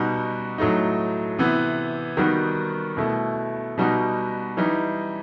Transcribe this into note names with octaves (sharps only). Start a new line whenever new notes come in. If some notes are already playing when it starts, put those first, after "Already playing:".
Already playing: B2 G3 D#4 F#4
A2 F#3 A3 D#4
C3 E3 B3
D#3 G3 B3 D#4 F#4
B2 A3 E4
B2 G3 D#4 F#4
E3 G3 D#4